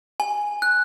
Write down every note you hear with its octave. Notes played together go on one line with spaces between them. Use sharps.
G#5
F#6